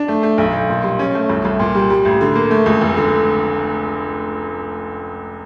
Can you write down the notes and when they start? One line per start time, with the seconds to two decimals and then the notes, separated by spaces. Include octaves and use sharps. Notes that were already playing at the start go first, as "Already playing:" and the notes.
Already playing: D4
0.08 A3
0.23 A3
0.38 B1
0.53 B1
0.69 A#2
0.84 G3
0.99 C#4
1.15 A3
1.29 C2
1.45 C2
1.59 A#2
1.75 G3
1.90 G3
2.05 A1
2.21 D3
2.35 A#3
2.51 A3
2.66 C#2
2.81 F1
2.97 D3